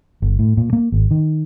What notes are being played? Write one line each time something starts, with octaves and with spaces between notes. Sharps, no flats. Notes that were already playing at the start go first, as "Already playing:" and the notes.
G1
A2
A#2
A#3
G#1
D#3